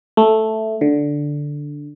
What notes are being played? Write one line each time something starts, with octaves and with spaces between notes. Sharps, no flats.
A3
D3